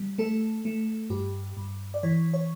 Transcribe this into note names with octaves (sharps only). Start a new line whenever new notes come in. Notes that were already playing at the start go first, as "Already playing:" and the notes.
Already playing: G3
A3 A4
A3
G2 G4
G2
D5
E3 C#5
C#5